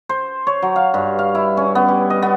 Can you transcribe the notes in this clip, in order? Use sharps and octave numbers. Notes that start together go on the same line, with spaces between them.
C5
C#5
F#3
F5
G2
F5
E4
C#4
B3
G4
D#5
B3